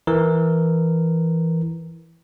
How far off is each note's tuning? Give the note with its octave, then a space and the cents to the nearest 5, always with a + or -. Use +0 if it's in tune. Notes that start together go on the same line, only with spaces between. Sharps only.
E3 +0 A#4 -5